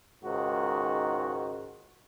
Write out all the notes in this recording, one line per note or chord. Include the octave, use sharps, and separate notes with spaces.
C#2 G#2 D#3 F#4